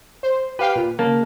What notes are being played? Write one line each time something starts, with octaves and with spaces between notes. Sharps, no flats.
C5
G4 B4 F5 G5
A#2
C#3 A#3 A5